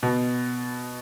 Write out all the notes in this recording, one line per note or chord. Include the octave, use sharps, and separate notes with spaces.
B2